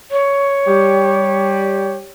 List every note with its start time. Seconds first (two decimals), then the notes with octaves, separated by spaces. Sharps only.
0.11 C#5
0.67 G3 G4